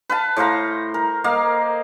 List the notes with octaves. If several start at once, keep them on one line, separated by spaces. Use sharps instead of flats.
B4 F5 A5
A2 C5 F5 A#5
A#4
A#3 D#5 F5